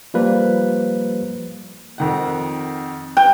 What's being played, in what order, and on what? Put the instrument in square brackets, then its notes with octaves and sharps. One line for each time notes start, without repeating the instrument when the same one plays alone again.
[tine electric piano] F3 G3 A#3 B4
[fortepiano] F2 D#3 F#5
[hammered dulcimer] G5